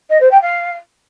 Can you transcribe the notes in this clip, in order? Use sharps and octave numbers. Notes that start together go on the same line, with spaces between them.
D#5
C5
G5
F5